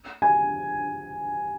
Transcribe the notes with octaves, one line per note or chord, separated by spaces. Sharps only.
G#5